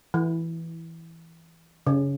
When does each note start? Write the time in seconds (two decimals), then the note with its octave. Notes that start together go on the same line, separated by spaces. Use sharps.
0.14 E3
1.87 C#3